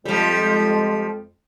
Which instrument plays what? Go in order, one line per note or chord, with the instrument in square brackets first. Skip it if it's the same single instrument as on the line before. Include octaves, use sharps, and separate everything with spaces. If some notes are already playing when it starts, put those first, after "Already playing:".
[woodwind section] F2 G#3 [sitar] F3 G3